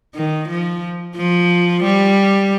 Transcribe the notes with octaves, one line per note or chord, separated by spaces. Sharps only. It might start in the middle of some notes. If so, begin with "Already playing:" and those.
D#3
F3
F3
G3